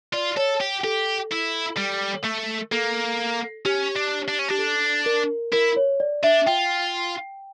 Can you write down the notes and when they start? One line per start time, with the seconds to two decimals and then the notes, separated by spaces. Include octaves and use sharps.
0.13 F4 D5
0.37 A4 C#5
0.60 G4
0.84 G4 A4
1.31 E4
1.77 G3
2.24 A3
2.71 A#3 A4
3.65 C#4 G4
3.96 D4
4.28 D4
4.39 C#4
4.48 D4 G4
4.59 A4
5.06 A#4
5.52 E4 A#4
5.76 C#5
6.00 D5
6.23 D4 E5
6.46 F4 G5